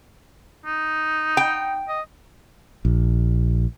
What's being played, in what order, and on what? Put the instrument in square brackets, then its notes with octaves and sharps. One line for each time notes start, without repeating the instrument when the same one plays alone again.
[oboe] D#4
[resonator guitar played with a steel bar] G5
[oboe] D#5
[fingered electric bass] A#1